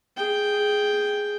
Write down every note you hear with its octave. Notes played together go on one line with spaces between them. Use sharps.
G#4 G5